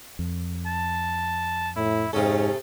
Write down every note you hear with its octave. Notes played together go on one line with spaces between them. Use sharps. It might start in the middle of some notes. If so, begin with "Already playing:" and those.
F2
A5
A2 E4
G#2 C3 C#4 A4